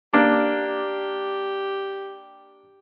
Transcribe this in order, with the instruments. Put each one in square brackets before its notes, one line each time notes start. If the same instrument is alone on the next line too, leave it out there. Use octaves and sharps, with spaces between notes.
[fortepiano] A#3 D4 [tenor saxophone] G4